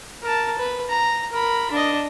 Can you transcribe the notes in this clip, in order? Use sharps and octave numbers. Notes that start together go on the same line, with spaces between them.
A#4 A5
B4
A#5
A#4 B5
D4 D#5